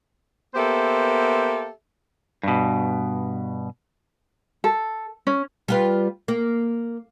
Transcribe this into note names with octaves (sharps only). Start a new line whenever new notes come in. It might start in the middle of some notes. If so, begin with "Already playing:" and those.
A#3 B3 G4 A4 C5 E5
G2 B2
A4
C#4
G3 F4 B4
A#3